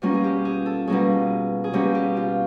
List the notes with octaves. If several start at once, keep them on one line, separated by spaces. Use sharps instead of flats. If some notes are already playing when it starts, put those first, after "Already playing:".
B2 G3 A#3 C#4 F4
G#4
G4
G#4
A4
B2 G3 A#3 C#4 G#4
G#4
B2 G3 A#3 C#4 G4
G4
F4